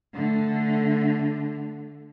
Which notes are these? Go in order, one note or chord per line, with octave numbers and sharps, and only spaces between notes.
D3 A3